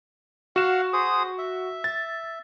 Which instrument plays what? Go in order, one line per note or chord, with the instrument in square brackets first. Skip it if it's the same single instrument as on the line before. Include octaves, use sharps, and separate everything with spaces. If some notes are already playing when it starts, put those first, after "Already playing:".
[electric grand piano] F#4 E7 [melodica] F5 F#5
[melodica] G#4 C5 D#6
E5
[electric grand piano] A6